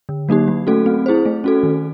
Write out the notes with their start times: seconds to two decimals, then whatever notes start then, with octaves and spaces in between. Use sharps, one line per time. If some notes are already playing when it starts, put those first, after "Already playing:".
0.09 D3
0.29 F#3 A#3 D#4 G4
0.48 F#3
0.67 A3 C#4 F#4 A4
0.86 C4
1.06 E4 G#4 C5
1.26 A3
1.44 C#4 F#4 A4
1.63 D#3